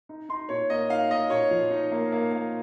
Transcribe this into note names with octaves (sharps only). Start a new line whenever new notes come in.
D#4
D#4 C6
A#2 C#5
A#3 D#5
D#4 F5
A#3 D#5
A#2 C#5
F3
D#4
A#3
A#3
A#3